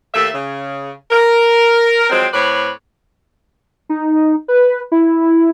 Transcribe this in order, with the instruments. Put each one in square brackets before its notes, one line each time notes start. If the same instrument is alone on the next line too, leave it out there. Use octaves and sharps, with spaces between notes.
[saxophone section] D#2 A3 A#3 E5
C#3
A#4
F3 F#3 G#3 C4
A2 C4 B4 C#5 D5
[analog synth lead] D#4
B4
E4